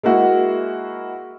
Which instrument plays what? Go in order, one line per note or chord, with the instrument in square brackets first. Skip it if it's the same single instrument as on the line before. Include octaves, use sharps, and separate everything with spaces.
[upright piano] G#3 A#3 E4 F#4